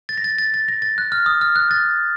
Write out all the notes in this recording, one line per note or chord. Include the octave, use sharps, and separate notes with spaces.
A6
A#6
A6
A6
A6
A#6
A6
F#6
F6
D#6
F6
F#6
A6